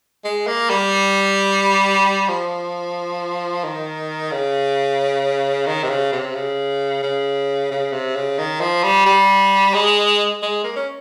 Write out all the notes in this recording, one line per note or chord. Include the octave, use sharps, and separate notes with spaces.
G#3
A#3
G3
F3
D#3
C#3
D#3
C3
C#3
C3
C#3
C#3
C#3
C3
C#3
D#3
F3
G3
G3
G#3
G#3
A#3
C#4